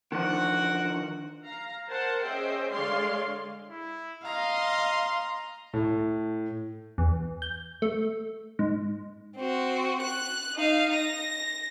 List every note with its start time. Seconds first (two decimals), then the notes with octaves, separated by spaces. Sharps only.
0.12 D3 D#3 F3 F#4 A#4 F#5
1.43 F5 A#5
1.90 A#4 C5 F#5 A5
2.22 C#4 G#4 C5 D#5 E5 G5
2.71 D3 G#3 C#5 D5 F5 C6
3.70 E4
4.25 D#5 F5 A#5 C6
5.74 A2
6.98 E2
7.42 G6
7.82 A3
8.59 G#2
9.36 C4 F#4
10.02 F#6
10.56 D#4 F5
10.94 A#6